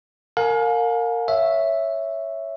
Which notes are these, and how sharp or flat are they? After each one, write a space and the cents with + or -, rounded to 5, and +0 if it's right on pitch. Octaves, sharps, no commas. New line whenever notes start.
A#4 -25 F5 +35 G#5 +25
C#5 +0 E5 +0